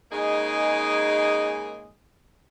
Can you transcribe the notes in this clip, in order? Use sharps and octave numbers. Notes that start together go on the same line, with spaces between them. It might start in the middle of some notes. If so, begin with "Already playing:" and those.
C#3 G#3 A#3 D#4 G#4